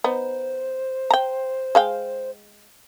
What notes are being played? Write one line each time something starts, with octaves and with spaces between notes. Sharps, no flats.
B3 D#4 C5
G5 A#5
G#3 F5 G5